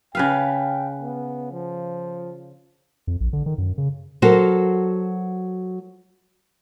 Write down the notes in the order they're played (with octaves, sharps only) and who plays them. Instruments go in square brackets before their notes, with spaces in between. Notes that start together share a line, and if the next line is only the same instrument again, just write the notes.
[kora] C#3 B4 F5 [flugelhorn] G5
[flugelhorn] B3
F3
[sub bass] F2
A#1
D3
D#3
F#2
C#3
[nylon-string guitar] F#3 F#4 A4 A#4 C5